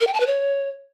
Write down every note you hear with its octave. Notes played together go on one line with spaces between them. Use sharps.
A#4
G5
A5
B4
C#5